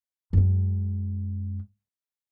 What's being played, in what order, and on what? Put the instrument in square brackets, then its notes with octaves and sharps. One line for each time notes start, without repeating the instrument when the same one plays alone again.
[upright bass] F#2 G#3